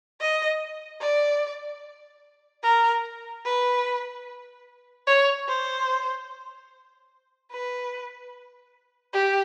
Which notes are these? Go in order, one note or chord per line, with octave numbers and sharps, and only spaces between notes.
D#5
D5
A#4
B4
C#5
C5
B4
G4